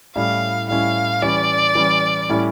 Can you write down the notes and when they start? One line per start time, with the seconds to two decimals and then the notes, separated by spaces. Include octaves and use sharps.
0.16 A2 G3 C#4 E4 F5
0.69 A2 G3 C#4 E4 F5
1.22 E3 G3 C#4 D5
1.75 E3 G3 C#4
2.29 A2 G3 C#4 E4